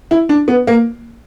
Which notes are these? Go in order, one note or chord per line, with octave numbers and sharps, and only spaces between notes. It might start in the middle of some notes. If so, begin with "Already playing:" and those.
E4
D4
B3
A#3